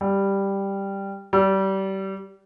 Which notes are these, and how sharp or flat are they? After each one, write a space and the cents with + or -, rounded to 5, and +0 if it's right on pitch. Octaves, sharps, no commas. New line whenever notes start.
G3 +5
G3 -25